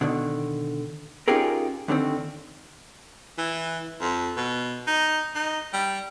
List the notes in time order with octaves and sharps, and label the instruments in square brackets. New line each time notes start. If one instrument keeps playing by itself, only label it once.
[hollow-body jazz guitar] B2 D3 D#3
C#4 D#4 F4 G4 G#4 A#4
D#2 D3 D#3 C4
[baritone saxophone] E3
F2
B2
D#4
D#4
G3